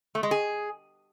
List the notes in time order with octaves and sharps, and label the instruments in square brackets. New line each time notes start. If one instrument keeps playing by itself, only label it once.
[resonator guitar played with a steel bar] A3
G#3
G#4